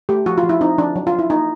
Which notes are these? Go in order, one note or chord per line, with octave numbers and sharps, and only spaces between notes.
A3 G4
F3 F#4
F4
F3
E4
C4 D#4
F3 D4
F#3
F4
F#3
E4
A#3 D#4